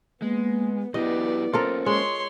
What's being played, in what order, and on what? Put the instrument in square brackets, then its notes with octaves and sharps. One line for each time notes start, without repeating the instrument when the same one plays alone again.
[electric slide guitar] G#3 [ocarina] A#3 [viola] B3
[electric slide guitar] F#3 G4 B4 [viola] B3 D5 [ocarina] E4 [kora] D#5
[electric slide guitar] A#3 C#4 [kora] F4 A4 A#4 [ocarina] C5
[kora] G#3 [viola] C#5 C6